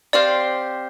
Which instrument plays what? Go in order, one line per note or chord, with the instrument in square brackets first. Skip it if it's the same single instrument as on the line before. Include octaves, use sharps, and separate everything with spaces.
[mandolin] C4 G4 C5 F5 [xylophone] D5